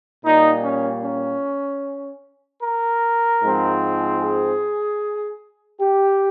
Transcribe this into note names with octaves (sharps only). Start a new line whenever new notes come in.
A#2 G3 A#3 D#4
C#4
C#4
A#4
G#2 F3 G#3 C4
G#4
G4